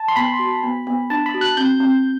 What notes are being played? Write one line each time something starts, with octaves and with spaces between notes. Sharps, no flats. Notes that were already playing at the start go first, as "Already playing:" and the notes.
Already playing: A5
C6
B3 B5
F#4
B3
B3
D4 A5
B5
F#4
F#6
C4 G6
C4